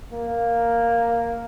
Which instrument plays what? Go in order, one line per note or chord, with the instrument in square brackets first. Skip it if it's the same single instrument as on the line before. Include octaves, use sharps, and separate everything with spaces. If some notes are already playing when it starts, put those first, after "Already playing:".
[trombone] A#3